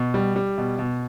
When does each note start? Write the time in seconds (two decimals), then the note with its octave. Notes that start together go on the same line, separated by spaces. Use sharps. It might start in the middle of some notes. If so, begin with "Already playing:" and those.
Already playing: B2
0.14 G3
0.36 G3
0.58 B2
0.79 B2